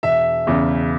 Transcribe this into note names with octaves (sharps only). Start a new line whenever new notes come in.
E1 E5
E2 C#3